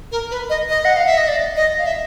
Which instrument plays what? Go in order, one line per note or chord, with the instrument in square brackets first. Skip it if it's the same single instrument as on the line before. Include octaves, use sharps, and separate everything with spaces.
[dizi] A#4
B4
D#5
D#5
F#5
F5
E5
D#5
D5
D#5
F5
E5